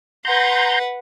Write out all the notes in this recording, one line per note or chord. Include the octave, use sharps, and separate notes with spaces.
B4 F#5 A#5 C6 G6